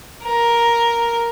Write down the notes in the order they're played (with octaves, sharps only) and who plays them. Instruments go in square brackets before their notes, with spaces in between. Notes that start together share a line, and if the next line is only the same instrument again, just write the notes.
[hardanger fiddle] A#4